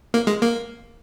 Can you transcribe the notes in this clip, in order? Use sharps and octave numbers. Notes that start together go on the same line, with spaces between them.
A#3
G#3
A#3